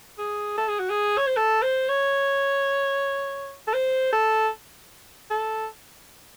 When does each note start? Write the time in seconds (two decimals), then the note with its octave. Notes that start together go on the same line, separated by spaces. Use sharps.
0.18 G#4
0.57 A4
0.68 G#4
0.79 F#4
0.90 G#4
1.17 C#5
1.27 C5
1.37 A4
1.62 C5
1.89 C#5
3.67 A4
3.74 C5
4.13 A4
5.30 A4